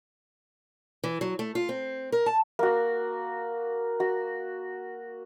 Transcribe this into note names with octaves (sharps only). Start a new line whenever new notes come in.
E3
F#3
A3
F4
C4
A#4
A5
A#3 F#4
F#4